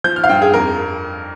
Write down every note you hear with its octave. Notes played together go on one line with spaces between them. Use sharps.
F3 G6
F6
F5
G2 G5
G#4
F2 A#4